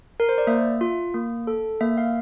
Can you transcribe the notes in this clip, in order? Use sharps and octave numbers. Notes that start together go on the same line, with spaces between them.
A#4
C5
D5
A#3 E5
F4
A#3
A4
A#3 E5
F5